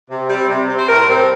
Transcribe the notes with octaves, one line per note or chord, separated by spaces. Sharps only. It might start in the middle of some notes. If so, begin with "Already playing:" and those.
C3
G3 C4
C3
G3 C4
C5
A2 A#4
G3 C4